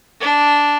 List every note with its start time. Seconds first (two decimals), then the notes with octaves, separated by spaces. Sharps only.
0.21 D4